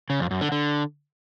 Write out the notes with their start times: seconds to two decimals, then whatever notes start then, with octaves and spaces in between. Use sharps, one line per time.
0.10 C#3
0.20 F2
0.31 F#2
0.41 D3
0.52 D3